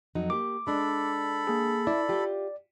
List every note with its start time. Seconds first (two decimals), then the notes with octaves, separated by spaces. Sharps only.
0.15 F2 F#3 D#4
0.30 A#3 G4 D6
0.67 G#3 D4 A4 B5
1.47 A#3 G#4
1.87 E4 D5
2.09 F4 G4